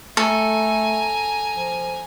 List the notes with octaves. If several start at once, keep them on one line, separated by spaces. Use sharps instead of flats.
A3 A4 G#5 A#5
F3